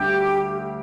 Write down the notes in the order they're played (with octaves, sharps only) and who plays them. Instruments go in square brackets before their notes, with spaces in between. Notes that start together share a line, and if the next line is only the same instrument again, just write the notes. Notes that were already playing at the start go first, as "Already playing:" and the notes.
Already playing: [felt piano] D2 D3 G3 D4 [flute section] G4